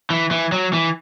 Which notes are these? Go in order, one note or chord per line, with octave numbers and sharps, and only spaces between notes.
E3
E3
F#3
E3